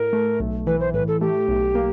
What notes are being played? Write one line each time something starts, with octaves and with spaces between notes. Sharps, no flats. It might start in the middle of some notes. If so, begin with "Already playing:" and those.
Already playing: A2 A#4
A3
B1
E3 B4
C5
A2 B4
A4
A3 G4
B1
A#3